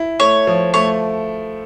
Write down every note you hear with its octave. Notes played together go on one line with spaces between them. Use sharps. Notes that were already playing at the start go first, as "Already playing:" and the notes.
Already playing: E4
A3 C#5
F3
A3 C#5